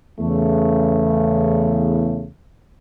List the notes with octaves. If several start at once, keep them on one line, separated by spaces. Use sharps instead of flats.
E2 C#3 A3